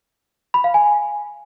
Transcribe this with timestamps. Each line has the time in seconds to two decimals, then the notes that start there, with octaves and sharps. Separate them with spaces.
0.54 B5
0.64 F5
0.74 G#5